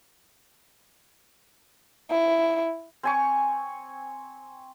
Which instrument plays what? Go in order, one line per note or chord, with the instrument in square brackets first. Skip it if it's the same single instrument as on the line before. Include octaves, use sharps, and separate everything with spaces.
[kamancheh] E4
[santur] C4 G#5 C#6